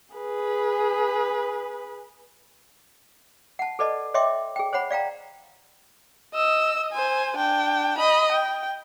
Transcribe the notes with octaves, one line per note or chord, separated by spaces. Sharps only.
G#4 B4
F#5 A5
A4 B4 D5 D#5 A5
C#5 D#5 E5 G5 C6 D6
G#4 G5
C5 C#5 F#5 B5
D5 F5 G5 A#5
D#5 E6
C5 G#5
D4 G5
D#5 B5
G5